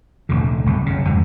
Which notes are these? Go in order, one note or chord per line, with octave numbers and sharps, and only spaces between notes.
F1 D2 A#2 D3
G1 C2 F#2
F#1 C#3
F2 G#2 E3 F#3